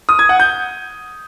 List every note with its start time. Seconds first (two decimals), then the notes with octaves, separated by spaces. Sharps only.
0.09 D#6
0.19 G#6
0.29 F#5
0.40 G6